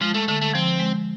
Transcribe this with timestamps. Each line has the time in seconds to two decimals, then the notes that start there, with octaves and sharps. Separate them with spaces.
0.01 F3 G#3
0.14 A3
0.28 D3 A3
0.41 A3
0.54 F3 C4
0.80 G#3